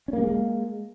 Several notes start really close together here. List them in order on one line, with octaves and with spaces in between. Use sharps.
C#4 A#3 G3 G#3